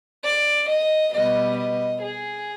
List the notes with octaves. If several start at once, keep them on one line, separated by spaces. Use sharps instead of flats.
D5
D#5
B2 G3 B3 D#5
D#5
G#4